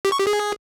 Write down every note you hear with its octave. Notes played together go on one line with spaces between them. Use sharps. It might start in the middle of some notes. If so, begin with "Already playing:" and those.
G4
C#6
G4
G#4